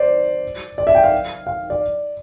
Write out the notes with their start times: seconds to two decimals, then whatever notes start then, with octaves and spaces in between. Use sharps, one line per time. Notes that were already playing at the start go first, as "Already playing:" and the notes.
Already playing: C5 D5
0.78 D5
0.87 E5
0.95 G5
1.03 F5
1.47 F5
1.70 D5